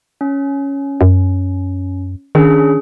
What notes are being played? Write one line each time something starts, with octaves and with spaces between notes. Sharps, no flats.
C#4
F#2
D#3 C#4 D4 G#4